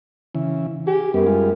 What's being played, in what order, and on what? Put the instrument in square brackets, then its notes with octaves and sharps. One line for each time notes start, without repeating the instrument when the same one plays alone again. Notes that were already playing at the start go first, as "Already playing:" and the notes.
[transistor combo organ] C#3 E3
[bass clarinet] G4 [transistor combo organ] G#4
[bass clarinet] F#2 [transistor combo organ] G3 B3
[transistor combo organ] G3 G#3 F4